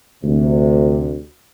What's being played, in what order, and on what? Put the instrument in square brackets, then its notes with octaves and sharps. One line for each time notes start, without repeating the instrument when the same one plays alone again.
[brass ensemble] D2 C3